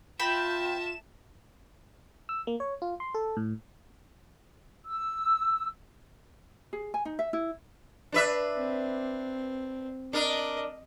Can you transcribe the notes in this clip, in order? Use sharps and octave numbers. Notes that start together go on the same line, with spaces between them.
C4 F4 E5 G5 A5 B5 E7
E6
A#3
C#5
F4
C6
A4
A2
E6
G#4
G#5
D#4
E5
E4
D4 B4 E5
C4
D4 A#4 D#5